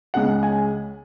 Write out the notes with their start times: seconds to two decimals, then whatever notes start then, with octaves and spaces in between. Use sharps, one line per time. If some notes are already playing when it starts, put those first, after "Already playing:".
0.14 C#2 C#3 G#3 F#5
0.43 G#5